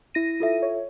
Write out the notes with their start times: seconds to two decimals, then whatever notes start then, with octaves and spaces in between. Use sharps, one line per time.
0.14 E4 A#6 D#7
0.40 F4 A4 E5
0.62 C#5